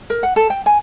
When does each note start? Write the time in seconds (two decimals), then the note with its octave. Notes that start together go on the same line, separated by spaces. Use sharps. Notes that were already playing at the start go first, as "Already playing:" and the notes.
0.10 A#4
0.23 F#5
0.36 A4
0.50 G5
0.66 G#5